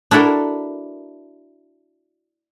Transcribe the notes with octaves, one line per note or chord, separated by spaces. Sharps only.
D4 E4 F#4 A4 A#4